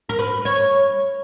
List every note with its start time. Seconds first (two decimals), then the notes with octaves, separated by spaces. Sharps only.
0.09 A#4
0.19 B4
0.45 C#5